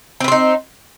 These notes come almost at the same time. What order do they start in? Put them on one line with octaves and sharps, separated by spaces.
C4 B4 C5 D#4